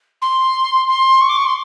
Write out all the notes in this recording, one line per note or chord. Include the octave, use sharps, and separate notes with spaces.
C6
C6
C#6
D6
C#6
C6